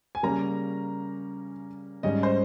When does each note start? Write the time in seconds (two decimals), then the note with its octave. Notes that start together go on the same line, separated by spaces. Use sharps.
0.15 G#5
0.23 C#3 G3 A#3 C#4 A#5
2.03 G#2 G3 C#4 D#5
2.23 C5